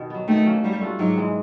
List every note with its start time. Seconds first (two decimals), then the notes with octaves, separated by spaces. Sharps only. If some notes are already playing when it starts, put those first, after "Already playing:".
Already playing: B2 D#3
0.10 F#3 B3
0.28 D#3 A3
0.46 F#3 A#3 C#4
0.64 F#3 G3
0.81 A3 D4 F4
0.99 G#2 F#3
1.17 E3 G#3